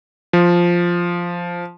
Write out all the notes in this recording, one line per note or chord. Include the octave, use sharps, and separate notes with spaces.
F3